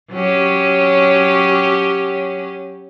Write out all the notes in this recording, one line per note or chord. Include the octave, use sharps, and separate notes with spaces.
F#3 C#4 G4